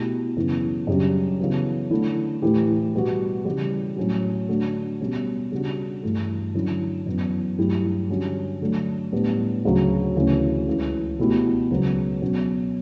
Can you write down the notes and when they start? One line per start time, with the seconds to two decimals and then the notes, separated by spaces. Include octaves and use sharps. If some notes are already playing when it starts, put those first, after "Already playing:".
Already playing: B2 A3 E4 G4
0.37 F#2 C#3 E3 B3 E4
0.87 F#2 C#3 G3 D4 G4
1.39 C#3 E3 B3 F#4
1.90 D3 A3 E4
2.42 A2 E3 A3 E4 G4
2.94 B2 G3 B3 F#4
3.45 C#3 E3 G3
3.96 A2 F#3 C#4 F#4
4.49 D3 A3 D4 F#4
5.00 B2 G3 C#4
5.52 C#3 G3 D4 F#4
6.03 G2 E3 A3
6.54 D3 F#3 C#4 E4
7.06 F#2 E3 B3
7.58 G2 F#3 A3 E4 G4
8.10 D3 G3 C#4 F#4
8.61 D3 F#3 A3 D4
9.12 A2 G3 B3 D4
9.65 D2 C#3 F#3
10.16 D2 C#3 E3 A3 C#4
10.67 C#2 C#3 E3
11.19 B2 A3 E4 G4
11.70 C#2 C#3 F#3 B3
12.22 B2 F#3 C#4